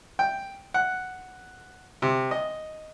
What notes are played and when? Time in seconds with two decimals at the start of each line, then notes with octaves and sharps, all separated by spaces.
0.19 G5
0.74 F#5
2.02 C3
2.31 D#5